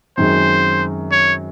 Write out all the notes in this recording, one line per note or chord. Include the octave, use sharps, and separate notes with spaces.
F#2 D#3 G#3 C4 C5
C#5